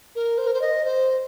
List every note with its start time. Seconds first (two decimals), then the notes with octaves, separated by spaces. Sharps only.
0.15 A#4
0.37 C5
0.46 A#4
0.53 C5
0.61 D#5
0.84 C5